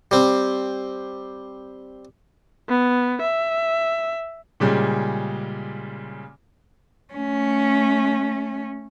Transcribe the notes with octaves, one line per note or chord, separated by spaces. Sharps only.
G3 C4
B3
E5
A#2 C#3 G3 G#3
A3 C#4